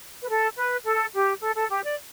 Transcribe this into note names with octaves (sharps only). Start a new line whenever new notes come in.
B4
A4
B4
A4
G4
A4
A4
G4
D5